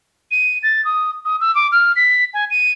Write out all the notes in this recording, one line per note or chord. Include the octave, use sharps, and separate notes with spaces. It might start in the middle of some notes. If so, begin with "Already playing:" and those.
D#7
A6
D#6
D#6
E6
D6
F6
B6
G#5
D#7